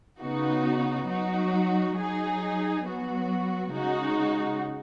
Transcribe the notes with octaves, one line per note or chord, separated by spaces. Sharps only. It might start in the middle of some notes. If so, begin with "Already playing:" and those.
C#3 B3 D#4 F#4
F#3 D#4 F#4
F#3 D#4 G#4
F#3 B3 F#4
C#3 G#3 D#4 F#4